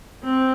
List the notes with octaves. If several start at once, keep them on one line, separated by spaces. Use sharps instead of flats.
C4